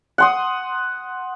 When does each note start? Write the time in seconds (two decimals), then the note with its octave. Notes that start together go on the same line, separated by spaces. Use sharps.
0.18 F#5 C6 D#6